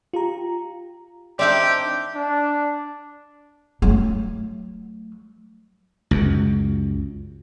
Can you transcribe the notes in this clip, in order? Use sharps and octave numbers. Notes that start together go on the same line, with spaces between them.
F4 G4 A#5
C4 D4 D#4 G4 D5 E5
D4
F#3 A3
C#2 F#2